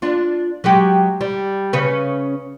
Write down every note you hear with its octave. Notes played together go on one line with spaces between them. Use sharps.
D4 F4
F#3 G#3 G4
G3
C#3 C#4 B4